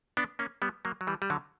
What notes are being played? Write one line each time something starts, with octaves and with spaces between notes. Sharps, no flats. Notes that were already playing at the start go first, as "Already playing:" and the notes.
B3 D4
A#3 C#4
G3 B3
F#3 A#3
F#3
E3 G3
G3
D3 F#3